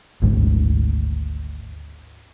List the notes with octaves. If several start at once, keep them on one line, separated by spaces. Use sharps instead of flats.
G#1 D2 G#2